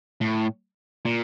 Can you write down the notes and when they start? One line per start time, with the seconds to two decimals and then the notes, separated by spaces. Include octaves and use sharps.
0.21 A2
1.05 A#2